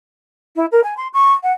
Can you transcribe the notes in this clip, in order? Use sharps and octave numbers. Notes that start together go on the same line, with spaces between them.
E4
A#4
G#5
C6
C#6
F#5